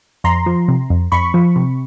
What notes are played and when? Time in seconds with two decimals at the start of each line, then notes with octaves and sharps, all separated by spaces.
0.24 F2 A#5 C6
0.46 F3
0.68 C3
0.90 F2
1.12 F2 B5 C#6
1.34 F3
1.56 C3